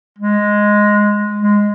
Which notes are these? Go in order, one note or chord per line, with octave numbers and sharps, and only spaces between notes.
G#3
G#3